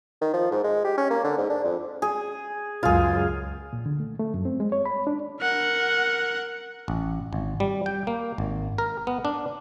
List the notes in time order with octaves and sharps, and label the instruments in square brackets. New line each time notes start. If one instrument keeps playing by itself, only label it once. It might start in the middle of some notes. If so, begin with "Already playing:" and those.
[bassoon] D#3
F3
G#2
G#3
G4
C#4
A#3
D3
G#2
D4
F2
[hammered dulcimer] G#4
[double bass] C#2 F#2 [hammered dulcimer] F4 G#4
[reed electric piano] A#2
D3
A3
A3
F#2
C4
G#3
C#5
B5
D4
[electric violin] A#4 F#5
[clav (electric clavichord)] A1
G#1
G3
G5
A#3
G#1
A#4
B3
D4